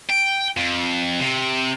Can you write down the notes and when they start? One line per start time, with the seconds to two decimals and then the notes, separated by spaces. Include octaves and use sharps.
0.10 G5
0.57 F2
1.20 C3